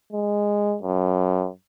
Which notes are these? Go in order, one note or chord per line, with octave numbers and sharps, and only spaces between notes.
G#3
F#2